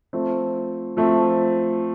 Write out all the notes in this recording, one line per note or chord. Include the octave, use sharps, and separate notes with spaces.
F3 A3 C4
F3 A3 C4